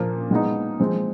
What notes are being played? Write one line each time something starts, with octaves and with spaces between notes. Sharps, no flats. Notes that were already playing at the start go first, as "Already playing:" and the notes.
Already playing: A#2 F3 A#3
G#3 B3 D#4
F3 G#3 C4